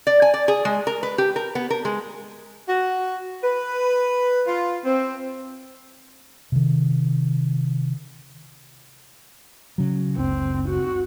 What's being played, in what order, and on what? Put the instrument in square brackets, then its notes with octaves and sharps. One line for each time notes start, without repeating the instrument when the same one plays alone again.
[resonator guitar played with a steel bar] D5
G#5
D5
G#4
G#3
A#4
B4
G4
A#4
B3
A#4
G#3
[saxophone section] F#4
B4
F4
C4
[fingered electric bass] C3 D#3
[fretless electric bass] C#3 F#3
[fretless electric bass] F#1 C#2 [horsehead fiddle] C4
[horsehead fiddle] F#4